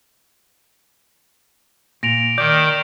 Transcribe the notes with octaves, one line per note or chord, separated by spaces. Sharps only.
A#2 A#6 D7 F7
D#3 D5 G6